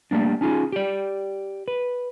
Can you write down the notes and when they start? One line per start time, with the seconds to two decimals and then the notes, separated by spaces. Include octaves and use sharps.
0.11 G3 A3 A#3 D4
0.41 C#4 D#4 F4 G#4
0.72 G4 D5
1.68 B4